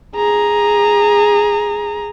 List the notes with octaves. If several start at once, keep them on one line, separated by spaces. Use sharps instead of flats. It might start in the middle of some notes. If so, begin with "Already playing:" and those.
G#4 A#5